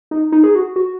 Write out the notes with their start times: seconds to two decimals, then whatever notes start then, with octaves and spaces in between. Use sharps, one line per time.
0.11 D#4
0.32 D#4
0.43 G#4
0.55 F#4
0.76 F#4